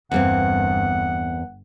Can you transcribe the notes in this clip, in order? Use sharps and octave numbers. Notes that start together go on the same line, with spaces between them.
G1 E2 G2 A#3 C4 F#5